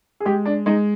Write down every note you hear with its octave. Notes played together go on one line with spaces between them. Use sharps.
G#4
G#3 G4
D4
G#3 D#4